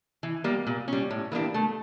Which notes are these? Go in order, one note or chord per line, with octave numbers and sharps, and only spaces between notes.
E3
G3 A#3
A#2
G3 C#4
A2
E3 A#3 D4 G4
A3